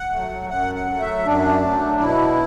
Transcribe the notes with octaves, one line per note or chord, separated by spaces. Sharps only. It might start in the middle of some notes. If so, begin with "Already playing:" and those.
Already playing: F#5
A3
F#3
F#2 F#5
F#5
F#3 A3
E5
F#2 D4
F#3 A3
B2 E4